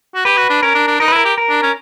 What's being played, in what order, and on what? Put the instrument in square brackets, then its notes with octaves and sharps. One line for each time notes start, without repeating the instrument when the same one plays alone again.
[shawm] F#4
[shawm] G4 [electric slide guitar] B4
[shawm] F#4
D4
[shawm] C#4 [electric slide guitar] A#4
[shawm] D4
D4
[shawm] D#4 [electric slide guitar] A#4
[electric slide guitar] B4
[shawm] E4 [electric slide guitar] A#4
[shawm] G4
[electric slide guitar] A#4
[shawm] D4
C#4